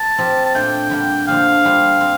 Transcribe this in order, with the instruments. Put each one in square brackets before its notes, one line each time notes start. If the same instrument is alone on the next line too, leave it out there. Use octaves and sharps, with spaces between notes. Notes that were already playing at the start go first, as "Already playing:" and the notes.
Already playing: [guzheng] A#3 [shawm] A5
[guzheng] F3 C4 G4 A#4
[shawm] A5
[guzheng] A#2 A3 D4 A4 C5 [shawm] G5
[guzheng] D3 G3 A#3
[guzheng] D3 F3 A#3 [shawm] F5
[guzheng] G3 D4 F4 C5
C4